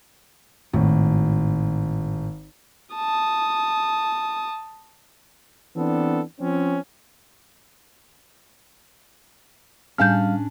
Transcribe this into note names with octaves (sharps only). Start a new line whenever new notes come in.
G#1 A2
A5 D#6
E3 B3 C4 D4 A4
F3 C4 C#4
A2 G3 C#4 D4 F5 A5 F6 G6